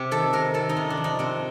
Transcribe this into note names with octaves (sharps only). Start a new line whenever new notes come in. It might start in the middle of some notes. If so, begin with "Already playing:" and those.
Already playing: C3 G4
D#3 A4
C3 A#4
D#3 A4
D#4
C3 F4
D4
F3
D#4
C3 C4